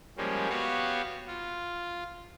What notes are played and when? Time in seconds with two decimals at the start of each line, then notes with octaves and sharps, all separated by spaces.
0.17 F3 G3 G#3 A#3 C#4
0.49 B3 F#4 G4 C#5 F5
1.28 F4